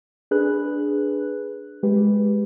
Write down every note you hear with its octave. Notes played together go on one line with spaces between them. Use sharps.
D4 G#4 B4 F#6
G#3 G4 B4